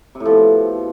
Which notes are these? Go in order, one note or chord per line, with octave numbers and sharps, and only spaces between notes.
C3
A2
F3
B2